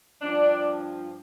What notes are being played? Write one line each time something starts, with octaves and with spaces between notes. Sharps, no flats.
G2 F3 D4